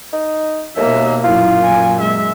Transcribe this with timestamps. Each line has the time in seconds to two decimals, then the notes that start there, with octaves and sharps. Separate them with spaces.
0.13 D#4
0.77 D#2 B2 A#3 E5
1.24 F#2 A#2 E4 F4
1.64 G#5
1.99 G#3 E5